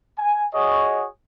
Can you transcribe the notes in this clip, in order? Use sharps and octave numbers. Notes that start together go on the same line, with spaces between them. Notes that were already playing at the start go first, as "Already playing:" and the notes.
G#5
F#4 G#4 C#5 D#5